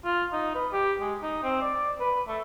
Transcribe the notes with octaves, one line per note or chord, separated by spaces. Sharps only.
F4
D#4
B4
G4
G#3
D#4
C4
D5
B4
A3